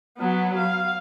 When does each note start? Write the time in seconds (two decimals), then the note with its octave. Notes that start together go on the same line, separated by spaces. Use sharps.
0.18 F#3 B3
0.58 F5